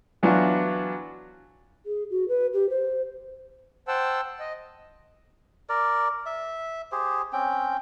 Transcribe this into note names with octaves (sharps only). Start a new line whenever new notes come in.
E3 F#3 B3 D4 F4 F#4
G#4
F#4
B4
G4
C5
C5 F#5 G5 A5 E6
D#5
A#4 D5
E5
G4 G#4 C5
C4 C#4 G5